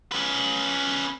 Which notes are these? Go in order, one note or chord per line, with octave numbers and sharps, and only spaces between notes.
C#4 B4